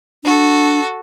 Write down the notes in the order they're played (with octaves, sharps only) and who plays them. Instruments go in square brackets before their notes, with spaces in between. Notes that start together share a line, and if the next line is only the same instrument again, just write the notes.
[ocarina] D4 [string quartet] F#4 A4